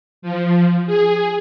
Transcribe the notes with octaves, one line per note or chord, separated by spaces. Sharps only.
F3
G#4